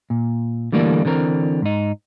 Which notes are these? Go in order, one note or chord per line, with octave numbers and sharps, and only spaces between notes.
A#2
D3 E3 G3 A3 A#3 D4
D3 E3 C4 A#4
G#2 D#4